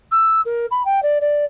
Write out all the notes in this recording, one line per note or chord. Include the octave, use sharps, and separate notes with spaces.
E6
A#4
B5
G5
D5
D5